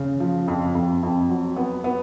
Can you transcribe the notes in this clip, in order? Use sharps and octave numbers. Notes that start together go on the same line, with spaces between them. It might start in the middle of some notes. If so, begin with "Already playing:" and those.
Already playing: C#3
F3
F2
F2
F2
F#3
B3
B3